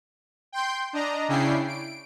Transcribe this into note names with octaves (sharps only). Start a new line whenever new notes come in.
G5 C6 G6
D4 D#5 A#5
C#3 C#4 D4 E4 G5 C7
D7